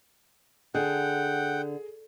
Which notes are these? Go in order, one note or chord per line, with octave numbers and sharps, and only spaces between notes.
D3 G#4 F#5 G5